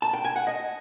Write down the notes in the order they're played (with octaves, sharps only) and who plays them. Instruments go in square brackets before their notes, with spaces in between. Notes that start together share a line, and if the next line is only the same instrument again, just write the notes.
[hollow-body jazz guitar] A5
G5
G#5
F#5
D#5